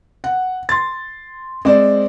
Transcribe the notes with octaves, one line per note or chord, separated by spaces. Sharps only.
F#5
C6 A6
G#3 C4 C5 D5